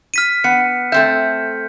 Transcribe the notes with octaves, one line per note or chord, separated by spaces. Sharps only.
F6 B6 D#7
B3 C#7
A3 C4 E5 G6